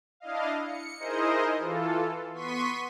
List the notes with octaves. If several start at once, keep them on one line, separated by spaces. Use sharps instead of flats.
D4 E4 D#5 F5
C#7
D#4 E4 G#4 A#4 C5 D#5
E3 F4 A4
B3 C6 C#6 B6 D#7